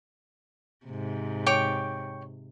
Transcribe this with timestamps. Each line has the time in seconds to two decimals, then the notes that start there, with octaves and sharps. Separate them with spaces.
0.86 G#2 C3
1.46 C#5 G5 D6